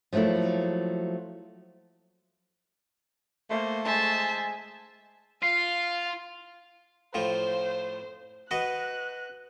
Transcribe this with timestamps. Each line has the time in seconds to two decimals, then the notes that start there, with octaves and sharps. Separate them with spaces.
0.13 F3 F#3 A3 A#3 E4
3.50 A3 A#3 C5
3.85 G#3 C5 E5 G#5 A5
5.43 F4 F5 C7
7.14 A2 F3 F4 C5
8.51 F#4 B4 D#5 F#6